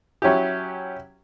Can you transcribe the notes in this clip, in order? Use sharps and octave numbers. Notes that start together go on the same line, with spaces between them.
F#3 C#4 E4 G4